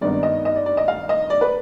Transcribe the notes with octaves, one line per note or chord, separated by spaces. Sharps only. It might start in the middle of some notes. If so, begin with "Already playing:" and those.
G#1 G2 D#3 B3 D#4 D5
D#5
D#5
D5
D5
D#5
F5
D#5
D5
B4